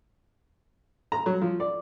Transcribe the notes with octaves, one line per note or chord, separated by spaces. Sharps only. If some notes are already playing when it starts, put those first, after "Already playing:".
A#5
F#3
F3
D5